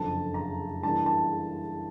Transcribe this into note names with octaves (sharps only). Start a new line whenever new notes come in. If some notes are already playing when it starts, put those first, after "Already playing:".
Already playing: F#1 F2 D3 A5
A#5
G2 E3 G3 A#3 D4 A5
A5